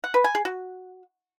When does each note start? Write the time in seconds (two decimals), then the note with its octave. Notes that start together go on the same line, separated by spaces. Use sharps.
0.04 F#5
0.14 B4
0.24 G#5
0.35 G#4
0.45 F#4